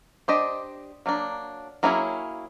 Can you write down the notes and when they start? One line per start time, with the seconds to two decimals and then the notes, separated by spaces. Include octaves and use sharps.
0.28 D4 G4 C5 D#5
1.06 F#3 A#3 D4
1.83 F#3 A#3 C#4 E4 G#4